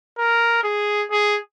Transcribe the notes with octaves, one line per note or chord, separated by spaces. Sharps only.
A#4
G#4
G#4